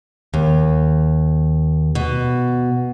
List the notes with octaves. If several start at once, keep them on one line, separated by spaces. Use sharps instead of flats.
D#2
B2